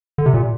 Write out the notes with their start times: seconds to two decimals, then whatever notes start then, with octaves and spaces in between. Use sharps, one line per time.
0.18 D3
0.26 C3
0.34 A#2